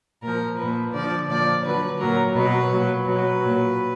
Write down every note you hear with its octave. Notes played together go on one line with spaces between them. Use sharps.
A#2 F3 A#4
A#2 F3 B4
D3 F3 D5
A#2 F3 D5
D3 F#3 B4
A#2 F#3 A#4
B2 F#3 B4
A#2 F#3
B2 F#3 B4
A#2 F#3